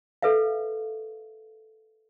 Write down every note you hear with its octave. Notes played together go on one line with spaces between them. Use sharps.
A4 B4 E5 F5